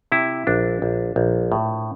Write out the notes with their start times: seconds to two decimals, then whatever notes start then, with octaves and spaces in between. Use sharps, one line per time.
0.12 C3 E4
0.47 A#1 D4
0.82 A#1
1.16 A#1
1.52 A2